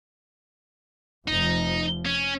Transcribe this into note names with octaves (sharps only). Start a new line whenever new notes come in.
F1 F3 D#4
C#4